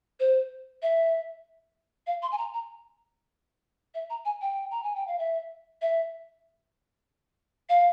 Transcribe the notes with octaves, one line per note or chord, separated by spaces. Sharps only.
C5
E5
F5
C6
G#5
A#5
A#5
E5
A#5
G#5
G5
A#5
G#5
G5
F5
E5
E5
F5